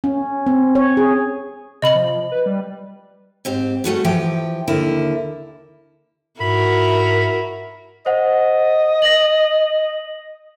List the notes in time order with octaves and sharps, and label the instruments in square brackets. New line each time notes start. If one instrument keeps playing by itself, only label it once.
[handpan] C#4
C4
C#5
G#4
[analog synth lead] C3 [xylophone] D#5 B5 F#7
[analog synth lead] F3
B4
G3
[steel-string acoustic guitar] G#2 C4 G4
G3 A3 F#4 G#4
E3 F3 G4 G5
D#2 D3 E4 A#4
[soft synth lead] G#2 [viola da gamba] E4 F#4 A#4 [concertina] B5
[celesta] C5 F#5 [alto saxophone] D#5
[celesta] A#6 F#7